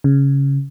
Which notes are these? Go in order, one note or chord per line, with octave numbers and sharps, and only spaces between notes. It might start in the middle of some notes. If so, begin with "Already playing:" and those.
C#3